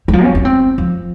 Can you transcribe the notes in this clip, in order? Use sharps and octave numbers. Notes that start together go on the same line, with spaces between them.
G3
F3
C#4
C#4
C4
F3